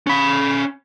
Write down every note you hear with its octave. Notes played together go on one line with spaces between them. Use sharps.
C#4 B5